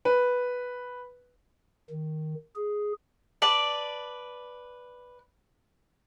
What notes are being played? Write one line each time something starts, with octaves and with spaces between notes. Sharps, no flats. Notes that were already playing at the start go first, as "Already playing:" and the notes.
B4
D#3
G#4
B4 D5 A5